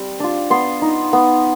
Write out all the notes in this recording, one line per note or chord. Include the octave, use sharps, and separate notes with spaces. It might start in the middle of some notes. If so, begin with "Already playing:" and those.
Already playing: G3 C4
D4 F4
B3 C6
D#4
B3